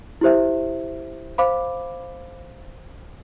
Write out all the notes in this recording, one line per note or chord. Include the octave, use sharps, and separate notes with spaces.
E4 G4 C5 E5
C5 F5 B5 D6